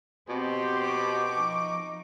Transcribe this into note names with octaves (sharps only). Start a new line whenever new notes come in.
B2 C4 G4 C5
C#6 D6
F3 D#4